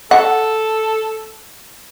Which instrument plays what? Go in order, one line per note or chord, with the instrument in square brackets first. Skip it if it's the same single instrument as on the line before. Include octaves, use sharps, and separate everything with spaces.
[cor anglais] A4 [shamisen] F#5